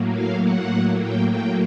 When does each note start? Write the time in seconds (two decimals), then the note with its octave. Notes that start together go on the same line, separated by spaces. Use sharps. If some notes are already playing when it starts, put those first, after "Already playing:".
Already playing: A2 F#3 A#3
0.13 F5
0.42 F#5
1.01 G5
1.30 G5